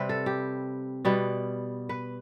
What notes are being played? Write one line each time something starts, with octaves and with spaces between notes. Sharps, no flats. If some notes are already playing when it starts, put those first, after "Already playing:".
Already playing: C3 G3 C4 B4
A4
G4
B2 G3 B3
B4